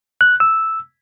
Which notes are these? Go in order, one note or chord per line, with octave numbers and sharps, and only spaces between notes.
F#6
E6